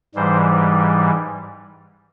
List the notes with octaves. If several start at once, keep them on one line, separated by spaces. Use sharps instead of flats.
G#2 E3 G3 C5